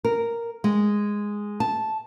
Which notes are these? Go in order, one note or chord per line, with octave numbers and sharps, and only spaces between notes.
A#4
G#3
A5